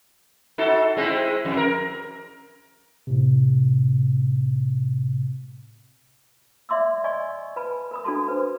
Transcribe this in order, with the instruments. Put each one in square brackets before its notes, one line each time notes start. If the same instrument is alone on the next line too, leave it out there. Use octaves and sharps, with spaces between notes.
[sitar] D#4 F#4 A4
G#3 C4 E4
F2
A#4
[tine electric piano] A2 C3
[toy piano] D5 E5 C6 D6 E6
D5 D#5 G#5 C#6
B4 G#5 A5 B5
A#4 B5 D#6
D4 F#4 A4 A5 C6
D4 B4 C5